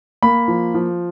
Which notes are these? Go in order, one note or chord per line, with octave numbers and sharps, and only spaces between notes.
A#3 B5
F3
F3